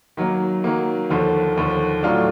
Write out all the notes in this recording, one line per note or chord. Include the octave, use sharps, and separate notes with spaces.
D#3 F#3 A#3
D#3 F#3 A#3
D#2 D3 F3
D#2 D3 F3
A2 F#3 A3 D4 F4